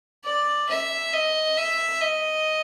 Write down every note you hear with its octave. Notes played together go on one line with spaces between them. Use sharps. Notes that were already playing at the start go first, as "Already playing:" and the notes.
D5
E5
D#5
E5
D#5